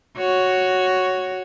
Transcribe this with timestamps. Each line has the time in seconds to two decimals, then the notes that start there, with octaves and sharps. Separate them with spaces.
0.18 F#4 C#5